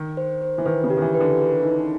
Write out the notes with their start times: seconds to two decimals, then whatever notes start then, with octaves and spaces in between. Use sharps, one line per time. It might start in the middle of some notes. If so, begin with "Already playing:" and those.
Already playing: D#3
0.17 C5
0.42 C5
0.58 E3
0.65 D#3 B4
0.84 C#3
0.90 G4
0.97 D#3
1.02 E3
1.14 B4
1.20 D3
1.39 G#4
1.63 D#4